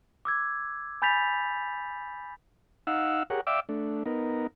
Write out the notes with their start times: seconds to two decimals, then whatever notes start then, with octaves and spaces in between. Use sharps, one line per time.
0.25 D6 E6 G#6
1.02 G#5 B5 G6 A6 B6 F7
2.87 D#4 F5 F#5 E6
3.30 G4 G#4 A#4 C#5 F#5
3.47 D5 E5 F5 G5 D6 E6
3.69 A3 D4
4.06 B3 D#4 A#4